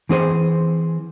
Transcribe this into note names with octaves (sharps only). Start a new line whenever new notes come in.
E3 C4 G#4 C5